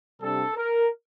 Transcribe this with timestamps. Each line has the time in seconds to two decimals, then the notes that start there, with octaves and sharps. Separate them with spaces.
0.20 C3 G3 D4 A4
0.56 A#4